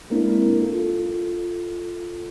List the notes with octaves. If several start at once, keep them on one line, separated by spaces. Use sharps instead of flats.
G#3 A#3 C4 D4 E4 A#4
F4 A4